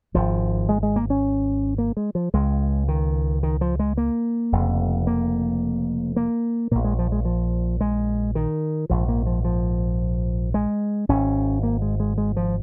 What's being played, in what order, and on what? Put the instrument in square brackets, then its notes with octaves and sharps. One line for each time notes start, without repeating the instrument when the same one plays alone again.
[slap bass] G#1 G#2 F3
G#3
G#3
A#3
C#4
A#3
G#3
F3
C#2 C#3 G#3
D#3
D#3
F3
G#3
A#3
F1 F2 C#3
A#3
A#3
A#1 A#2 A#3
G#3
F3
G#3
F3
G#3
D#3
A#1 G#2 F3
A#3
F3
F3
G#3
G#1 G#2 C#4
A#3
G#3
G#3
G#3
F3